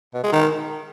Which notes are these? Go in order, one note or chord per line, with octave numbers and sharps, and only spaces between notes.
B2
G#3
D#3